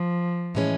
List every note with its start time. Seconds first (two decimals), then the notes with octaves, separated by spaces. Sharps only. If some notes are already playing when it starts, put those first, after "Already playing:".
Already playing: F3
0.55 A2 E3 G#3 C#4